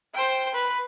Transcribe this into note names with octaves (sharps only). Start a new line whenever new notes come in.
C5 G5
B4